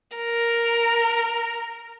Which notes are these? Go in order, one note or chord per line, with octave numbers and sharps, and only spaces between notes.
A#4